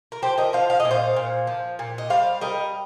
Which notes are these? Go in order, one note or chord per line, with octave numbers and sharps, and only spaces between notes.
A#4
F3 G4 C5
A#4 D#5
F3 C5 F5
F5
D#5
A#2
C5 F5
A#2
F3
A#2
D#5
G3 C5 F5
G3 A#4 D#5